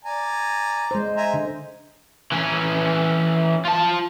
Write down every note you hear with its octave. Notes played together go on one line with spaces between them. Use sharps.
D5 G#5 A#5
G#3 C5
E5 G#5 A#5
D3
E3 C#4
F4 A5